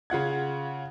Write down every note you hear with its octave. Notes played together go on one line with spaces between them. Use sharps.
C#3 F4 F#5 G#6